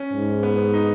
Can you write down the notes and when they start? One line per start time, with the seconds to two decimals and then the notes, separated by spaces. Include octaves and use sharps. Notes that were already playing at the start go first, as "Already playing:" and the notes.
Already playing: C#4
0.14 G#2
0.43 B3
0.74 D#4